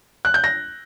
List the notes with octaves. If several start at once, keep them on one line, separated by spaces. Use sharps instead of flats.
F#6
G6
A#6